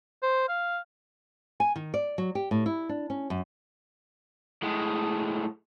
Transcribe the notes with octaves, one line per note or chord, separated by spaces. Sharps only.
C5
F5
G#5
D#3
D5
F#3
G4
A2
E4
D4
C#4
F#2
A2 G#3